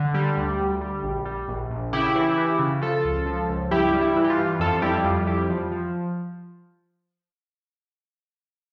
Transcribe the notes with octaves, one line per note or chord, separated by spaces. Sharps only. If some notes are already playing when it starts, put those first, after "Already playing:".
Already playing: D3
G3
D2
D2
G3
A#1
G3
A#1
A#1
C#3 E4 G4
E3
E3
C#3
F3 F4 A4
C#2
F3
C#2
G2 E4 G4
G3
E4
E3
G4
F4
G2
F2 F4 A4
G3 E4 G4
F2 F4
G3 E4 G4
F3
F3